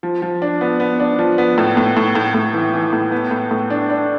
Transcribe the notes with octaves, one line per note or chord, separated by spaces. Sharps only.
F3
F3
D4
B3
B3
D4
F3
B3
A2
A2
A2
A2
A2
E3
E3
A2
B3
A2
A2
D4
D4